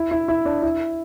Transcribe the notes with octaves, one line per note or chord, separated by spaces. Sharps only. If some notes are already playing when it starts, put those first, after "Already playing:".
Already playing: E4
E4
E4
D4
E4